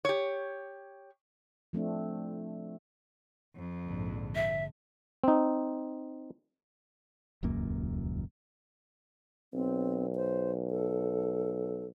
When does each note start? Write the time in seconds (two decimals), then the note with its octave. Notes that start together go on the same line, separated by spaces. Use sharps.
0.05 G4 C#5
1.73 F3 A3 C4 D4
3.55 F2
3.86 A#1 G#2 D3
4.35 E5
5.24 C4 D#4
7.43 D#1 C#2 F#2 A#3
9.54 B1 C4
10.16 C5
10.71 A4